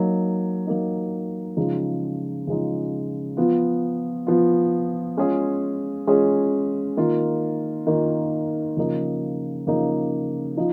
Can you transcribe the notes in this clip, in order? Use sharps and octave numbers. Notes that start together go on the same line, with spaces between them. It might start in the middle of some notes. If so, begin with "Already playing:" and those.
Already playing: F#3 A#3 D#4
F#3 A#3 D#4
C#3 F3 G#3 D#4
C#3 F3 G#3 D#4
F3 B3 F4
F3 B3 F4
G#3 C#4 F4 G#4
G#3 C#4 F4 G#4
D#3 A#3 F4
D#3 A#3 F4
C#3 F3 A#3 D#4
C#3 F3 A#3 D#4
F3 D#4